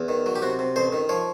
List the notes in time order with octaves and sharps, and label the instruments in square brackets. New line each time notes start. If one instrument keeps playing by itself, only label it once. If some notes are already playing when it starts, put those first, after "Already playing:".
Already playing: [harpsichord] E2
D#3
F#3
G4
C3 F#4
C3
A1 C5
D#3
F3 C#5